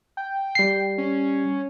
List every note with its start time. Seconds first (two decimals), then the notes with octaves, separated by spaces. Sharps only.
0.17 G5
0.55 G3 C7
0.98 C#4